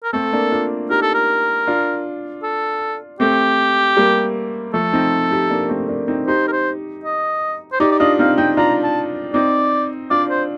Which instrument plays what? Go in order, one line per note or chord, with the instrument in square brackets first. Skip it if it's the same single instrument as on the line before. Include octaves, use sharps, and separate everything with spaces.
[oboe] A#4
[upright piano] A3 C4 [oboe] A4
[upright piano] A#3 D4
D4 F4
[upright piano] D#4 G4 [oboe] A#4
[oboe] A4
A#4
[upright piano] D4 F4
[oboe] A4
[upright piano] A3 C4 [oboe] G4
[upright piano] G3 A#3
[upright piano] F3 A3 [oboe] A4
[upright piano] C4 D#4
D#4 G4
A#3 D4
A3 C4
A#3 D4
C4 D#4
[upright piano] D#4 G4 [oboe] C5
[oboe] A#4
C5
D#5
C5
[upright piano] D#4 G4 [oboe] D5
[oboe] D5
[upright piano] D4 F4 [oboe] D#5
[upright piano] C4 D#4 [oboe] F5
[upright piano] C4 D#4 [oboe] G5
[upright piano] D4 F4 [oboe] A#5
[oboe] A5
[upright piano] C4 D#4 [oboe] D5
[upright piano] D4 F4 [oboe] D5
[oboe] C5